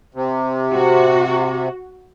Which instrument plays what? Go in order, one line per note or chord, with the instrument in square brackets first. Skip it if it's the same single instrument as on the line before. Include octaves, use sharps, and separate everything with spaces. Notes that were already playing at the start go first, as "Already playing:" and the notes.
[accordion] C3
[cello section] F#4